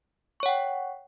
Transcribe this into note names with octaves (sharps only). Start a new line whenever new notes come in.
C#5 F#5 G5 C#6